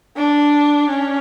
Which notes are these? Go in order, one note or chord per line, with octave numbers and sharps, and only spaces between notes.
D4
C#4